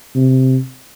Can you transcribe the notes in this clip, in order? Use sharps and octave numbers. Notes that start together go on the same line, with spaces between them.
C3